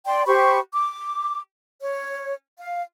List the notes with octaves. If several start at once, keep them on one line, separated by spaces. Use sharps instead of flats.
D5 G5 C6
G4 C5 B5 C#6
D6
C#5
F5